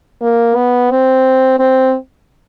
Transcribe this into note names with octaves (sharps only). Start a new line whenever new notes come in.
A#3
B3
C4
C4